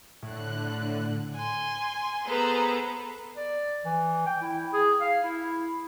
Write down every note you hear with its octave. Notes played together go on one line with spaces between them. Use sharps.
A2 D3 F#6
G#5 C6
B3 G#4 A4 B4 C5 A#5
D5
E3
G5
E4
G#4
F5
E4